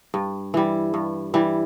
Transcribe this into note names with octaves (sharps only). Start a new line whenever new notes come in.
G2
E3 G3
G2
E3 G3